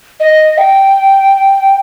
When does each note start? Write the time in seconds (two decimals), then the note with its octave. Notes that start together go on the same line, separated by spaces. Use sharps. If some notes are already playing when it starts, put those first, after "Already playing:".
0.19 D#5
0.57 G5